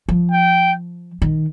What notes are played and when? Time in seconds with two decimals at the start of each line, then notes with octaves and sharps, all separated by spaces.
0.09 F3
0.32 G5
1.22 D#3